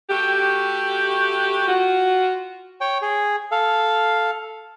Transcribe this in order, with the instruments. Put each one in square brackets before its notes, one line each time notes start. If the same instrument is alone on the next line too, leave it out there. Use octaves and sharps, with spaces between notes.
[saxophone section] A3 F#4 G4
F4 F#4
[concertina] C#5 G5
G#4
A4 F5